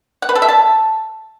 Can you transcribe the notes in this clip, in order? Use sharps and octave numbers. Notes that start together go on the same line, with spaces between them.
F#5
B4
A4
E5
A5